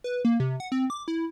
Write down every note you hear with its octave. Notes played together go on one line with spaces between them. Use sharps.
B4
A#3
C3
F#5
C4
D6
E4